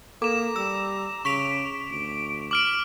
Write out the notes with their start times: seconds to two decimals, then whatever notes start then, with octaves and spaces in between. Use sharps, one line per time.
0.22 A#3 A4 A#5 D6 E7
0.56 G3 E6
1.25 C#3 C#6 B6 D7 F7
1.91 D2 D7
2.51 D6 F6 D7 F#7